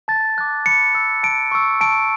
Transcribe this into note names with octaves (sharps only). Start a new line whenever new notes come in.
A5 A6
D6 F#6
B5 C#7
E6
A5 D7
C#6 E6
A5 D7